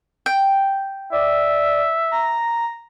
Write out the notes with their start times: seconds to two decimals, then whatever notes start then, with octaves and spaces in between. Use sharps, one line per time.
0.26 G5
1.12 D5 E5
2.11 A#5